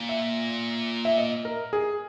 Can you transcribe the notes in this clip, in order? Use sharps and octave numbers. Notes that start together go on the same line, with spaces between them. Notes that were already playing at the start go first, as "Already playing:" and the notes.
Already playing: A#2
E5
E5
D#5
A#4
G#4